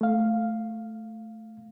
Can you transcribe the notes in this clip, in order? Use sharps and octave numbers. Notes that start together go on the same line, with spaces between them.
A3 F5